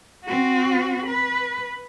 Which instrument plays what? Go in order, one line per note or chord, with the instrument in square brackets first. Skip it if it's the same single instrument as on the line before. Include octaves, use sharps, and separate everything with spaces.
[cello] C4 F#4
B4